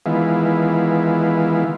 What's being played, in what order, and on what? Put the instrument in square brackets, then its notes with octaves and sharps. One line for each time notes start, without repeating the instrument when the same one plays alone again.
[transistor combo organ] D#3 E3 G#3 B3 E4 F4